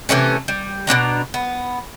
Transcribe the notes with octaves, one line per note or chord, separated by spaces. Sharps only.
C3 E3 A3 C#4
G3
B2 C#4 D4 A#5
B3